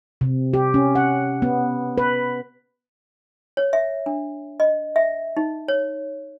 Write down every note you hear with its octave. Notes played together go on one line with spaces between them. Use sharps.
C3
G4
C#4
F#5
B3
B4
C#5
E5
D4
D#5
E5
D#4
C#5